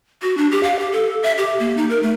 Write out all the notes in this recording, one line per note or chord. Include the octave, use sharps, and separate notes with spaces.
F#4
D4
G4
F5
G4
A4
E5
G4
A#3
D#4
A#4
A3